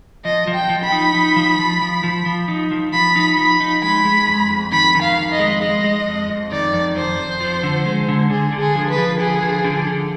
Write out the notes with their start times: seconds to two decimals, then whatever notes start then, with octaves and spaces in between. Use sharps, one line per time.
0.25 F3 D#5
0.47 F3
0.54 G5
0.69 F3
0.84 B5
0.92 D#4
1.14 D#4
1.36 F3
1.59 F3
1.82 F3
2.04 F3
2.26 F3
2.48 D#4
2.71 F3
2.93 F3 B5
3.16 D#4
3.37 F3 B5
3.60 D#4
3.82 G#3 B5
4.05 G#3
4.27 F2
4.50 F2
4.72 D#3 B5
4.95 D#3
5.02 F5
5.17 F2
5.32 D#5
5.39 G#3
5.62 G#3 D#5
5.84 G#3
6.06 F2
6.29 F2
6.51 D#3 D5
6.73 F2
6.96 F2 C5
7.18 F2
7.40 F3
7.63 D3
7.86 G#3
8.08 D3
8.30 D3 G#4
8.53 D3
8.60 G#4
8.75 F3
8.90 B4
8.98 F3
9.19 D3 G#4
9.42 F3
9.65 D3
9.87 D3